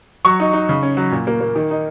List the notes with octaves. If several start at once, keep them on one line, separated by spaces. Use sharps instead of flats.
F#3 C#6
D#4
D#4
C#3
C#4
F#3
A#2
A#3
A#3
D#3
D#4